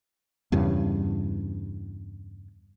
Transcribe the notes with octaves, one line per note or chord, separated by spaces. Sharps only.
E2 G2 C#3